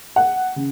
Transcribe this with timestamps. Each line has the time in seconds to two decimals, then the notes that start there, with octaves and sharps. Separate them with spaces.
0.16 F#5
0.56 C#3